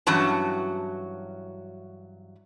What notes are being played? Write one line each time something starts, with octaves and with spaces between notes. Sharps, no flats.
G2 E3 F#3 C#4 F#4 A5